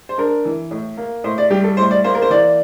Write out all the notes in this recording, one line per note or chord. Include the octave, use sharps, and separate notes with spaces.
C5
D4 A#4
E3
A2
A#3
A2 C5
D5
G3 G4
A4
A2 C5
D5
A#3 C5
A#4
C5
E3 D5